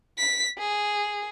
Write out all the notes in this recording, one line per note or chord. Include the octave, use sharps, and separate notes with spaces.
B6
G#4